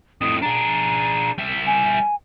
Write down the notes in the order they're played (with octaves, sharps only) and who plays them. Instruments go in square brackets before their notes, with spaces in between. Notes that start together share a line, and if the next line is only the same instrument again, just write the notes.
[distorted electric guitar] F2 A2 [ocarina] D#6
[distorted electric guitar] D4 G#4 [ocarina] A#5
[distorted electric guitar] G3 E5
[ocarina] G#5